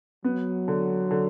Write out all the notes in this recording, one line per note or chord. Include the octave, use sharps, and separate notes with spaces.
F#3 B3
D3
D3